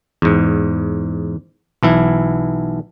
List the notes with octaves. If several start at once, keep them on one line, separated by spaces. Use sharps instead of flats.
E2 G#2
B1 E3 E4